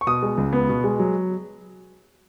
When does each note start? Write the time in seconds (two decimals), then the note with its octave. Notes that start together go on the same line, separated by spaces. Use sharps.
0.01 C#6
0.07 B2 D#6
0.22 G#3
0.38 C#2
0.53 B3
0.69 B2
0.84 G#3
0.99 F#3